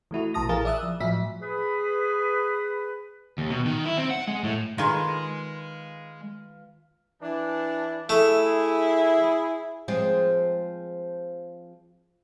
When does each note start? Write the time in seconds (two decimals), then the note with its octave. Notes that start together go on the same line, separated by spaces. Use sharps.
0.11 E3 A3 E4 F#4
0.34 A#1 B2 E3 A5 D#6 A#6
0.49 A#1 E3 G#4 A#4 F5 A6
0.65 D5 E5 D#6 E6 F#6
0.83 F3
1.00 A2 F3 F#3 E5 B6
1.42 G#4 B4
3.38 D#2
3.50 B2
3.66 D#3
3.85 E4
3.98 C4
4.10 F#5
4.28 G#3
4.44 A2
4.78 D#3 G#3 F4 G#4 B4 D#5
7.22 E3 D4
8.09 A3 E4 G#4
9.88 F3 G#3 C4